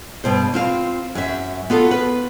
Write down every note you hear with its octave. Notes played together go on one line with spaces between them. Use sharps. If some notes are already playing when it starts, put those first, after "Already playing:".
G2 B2 C5
C4 F4 F5
F#2 E5
B3 F4 F#4 A4
B4